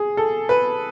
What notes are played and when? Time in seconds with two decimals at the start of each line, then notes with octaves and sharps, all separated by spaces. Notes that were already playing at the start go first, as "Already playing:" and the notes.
Already playing: G#4
0.17 A4
0.49 B4